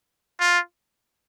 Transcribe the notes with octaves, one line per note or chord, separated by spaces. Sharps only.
F4